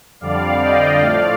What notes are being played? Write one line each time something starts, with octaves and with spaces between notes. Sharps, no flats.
F2 D3 G3 D5 F5
D#5 G5
A2 F3 A3 D5 F5